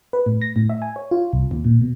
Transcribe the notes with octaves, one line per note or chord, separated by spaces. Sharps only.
B4
A2
A#6
A2
E5
G#5
C#5
F4
C2
D#2
A#2
B2